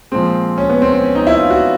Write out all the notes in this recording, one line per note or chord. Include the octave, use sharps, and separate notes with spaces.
A#2 F3 G#3 C4
C#4
B3
C4
C4
C#4
D#4
E4
F4
F#4